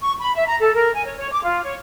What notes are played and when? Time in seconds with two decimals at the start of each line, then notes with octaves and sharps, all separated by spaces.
0.01 C#6
0.20 B5
0.34 E5
0.46 A#5
0.60 A4
0.74 A#4
0.94 G#5
1.05 C#5
1.18 C#5
1.32 D6
1.44 F4
1.63 C#5